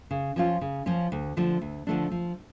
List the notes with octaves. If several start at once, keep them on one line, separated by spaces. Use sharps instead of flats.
C#3
F3 C#4 F4
C#3
F3 C#4 F4
D2
D3 F3 A3 D4
D2
D3 F3 A3 D4
F3